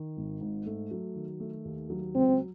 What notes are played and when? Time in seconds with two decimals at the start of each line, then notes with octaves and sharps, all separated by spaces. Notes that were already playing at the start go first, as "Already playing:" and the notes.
Already playing: D#3
0.17 G#1
0.41 G#2
0.66 A3
0.91 F#3
1.15 D#3
1.40 A3
1.65 D#2
1.90 F#3
2.15 C#2 C4